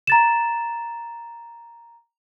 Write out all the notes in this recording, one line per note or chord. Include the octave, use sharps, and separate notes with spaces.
A#5 A6 E7